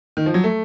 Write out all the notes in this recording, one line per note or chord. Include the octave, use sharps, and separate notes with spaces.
D#3
F3
F#3
A3